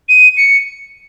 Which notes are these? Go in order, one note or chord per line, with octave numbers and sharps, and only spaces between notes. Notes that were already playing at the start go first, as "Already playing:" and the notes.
D#7
C#7